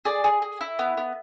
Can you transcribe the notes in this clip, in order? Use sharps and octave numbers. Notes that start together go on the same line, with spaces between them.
G#4 D5
G#4
G#4
E4
B3
B3